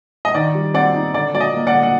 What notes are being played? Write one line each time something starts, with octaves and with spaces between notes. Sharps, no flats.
D#5
D#3 D5
G3
C4 D5 F#5
D#4
D3 D5
F#3 D5
D#5
A#3
D5 F#5
D3
F#5